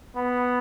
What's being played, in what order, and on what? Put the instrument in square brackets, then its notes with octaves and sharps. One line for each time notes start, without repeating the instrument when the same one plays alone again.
[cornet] B3